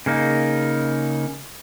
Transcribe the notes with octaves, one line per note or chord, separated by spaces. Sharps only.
C#3 A#3 D#4